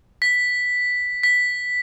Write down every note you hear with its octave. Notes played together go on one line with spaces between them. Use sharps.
B6
B6